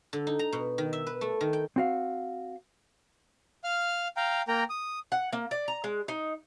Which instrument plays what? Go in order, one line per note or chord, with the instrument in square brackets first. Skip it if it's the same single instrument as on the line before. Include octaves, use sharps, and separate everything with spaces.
[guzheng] D3
D#4
A#5
B2
D#3
E5
B4
A3
D#3
G5
[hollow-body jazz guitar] C4 F#4 F5
[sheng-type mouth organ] F5 F6
F5 G5 A#5
A#3 A#4 G5 A#5
D#6
[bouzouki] F#5
A#3
D5
A#5
G#3
D#4